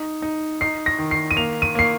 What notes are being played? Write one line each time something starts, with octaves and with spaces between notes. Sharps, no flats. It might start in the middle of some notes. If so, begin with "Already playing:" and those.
Already playing: D#4
D#4
D#4 C7
A#6
D#3
C7
D#7
A#3 F7
D#7
A#3 C7